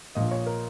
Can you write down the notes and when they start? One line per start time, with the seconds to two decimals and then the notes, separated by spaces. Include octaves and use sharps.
0.15 A#1 A#2 D#5
0.31 C#5
0.46 A#4